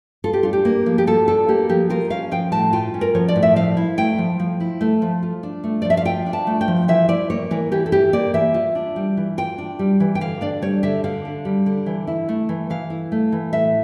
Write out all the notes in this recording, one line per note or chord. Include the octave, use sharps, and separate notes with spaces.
F4 A4
G4
D4 F4
G4
A#3
F3
G4
F4 A4
D4 A4
A#3 G4
F3 G4
F4 A#4
C#4 F5
F3 G5
A2 A5
F4 G5
C#4
A#4
F3 C#5
D5
A2
E5
F3 F5
E4
A3 G5
F3
F3
E4
A3
F3
F4
D4
A3
D5
F3
E5
F5
F4 G5
D4
A5
A3
G5
F3
E3 E5
E4 D5
A#3 C#5
E3 A#4
E3 G4
A4
E4 G4
A#3 D5
E3 E5
F4
D4
G3
E3
F4 G5
D4
G3
E3
G5
D3 F5
D4 D5
G3 C#5
D3 E5
D3 F5
D4
G3
D3
E3
E4
A3
E3
E3 F5
E4
A3
E3
A2 E5